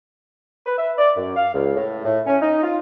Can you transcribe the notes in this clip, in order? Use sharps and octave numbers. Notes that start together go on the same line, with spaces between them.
B4
E5
D5
F#2
F5
C#2
A2
A2
C#4
D#4
F4